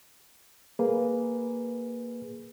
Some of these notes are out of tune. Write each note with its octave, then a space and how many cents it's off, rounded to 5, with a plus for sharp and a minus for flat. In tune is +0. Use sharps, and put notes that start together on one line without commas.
A#3 +0 G#4 +0 B4 +0